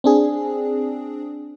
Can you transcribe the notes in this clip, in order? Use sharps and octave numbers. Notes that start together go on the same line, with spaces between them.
C4 D4 G#4